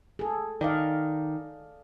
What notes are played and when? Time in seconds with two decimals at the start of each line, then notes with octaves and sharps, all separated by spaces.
0.19 G#4 A4
0.61 D#3 D5 D#5 F5